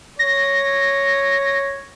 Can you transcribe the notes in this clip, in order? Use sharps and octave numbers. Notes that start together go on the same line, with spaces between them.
C#5 A#6